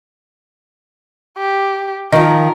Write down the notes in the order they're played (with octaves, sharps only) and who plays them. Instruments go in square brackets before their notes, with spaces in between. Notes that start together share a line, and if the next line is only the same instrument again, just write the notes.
[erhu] G4
[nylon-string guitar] D#3 F3 [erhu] A#4 [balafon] D#5